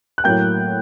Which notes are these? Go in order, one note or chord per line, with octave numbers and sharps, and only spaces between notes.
F#6
A2 F#3 A#3 G5 G6